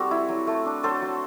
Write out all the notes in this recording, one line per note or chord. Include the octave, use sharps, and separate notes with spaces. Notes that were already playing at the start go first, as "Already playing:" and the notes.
Already playing: G3 C4 F#4 A4
E4
F#3
A3
D4
F#3 A4 C5
F#3